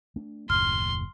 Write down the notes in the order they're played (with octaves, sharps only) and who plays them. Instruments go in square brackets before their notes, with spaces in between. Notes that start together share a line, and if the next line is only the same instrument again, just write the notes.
[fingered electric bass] A3 D4
[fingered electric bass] F#1 D#2 A2 [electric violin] C6 [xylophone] F6